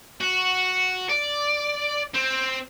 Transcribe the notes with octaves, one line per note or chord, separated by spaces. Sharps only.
F#4
D5
C4